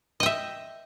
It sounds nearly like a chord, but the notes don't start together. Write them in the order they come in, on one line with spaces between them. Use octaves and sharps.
D#5 G5 E5